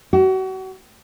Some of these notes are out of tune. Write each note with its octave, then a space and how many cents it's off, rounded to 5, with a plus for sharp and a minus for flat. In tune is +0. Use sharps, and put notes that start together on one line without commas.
F#4 +35